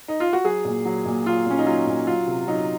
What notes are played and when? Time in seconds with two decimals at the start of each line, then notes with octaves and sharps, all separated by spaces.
0.08 D#4
0.20 F4
0.33 F#4
0.44 F#3 G#4
0.65 A#2
0.85 F#3
1.06 A#2
1.26 F#3 F4
1.46 A#2 C#4
1.58 D#4
1.66 F#3 F4
1.86 A#2
2.07 F#3 F4
2.27 C3
2.47 F#3 D#4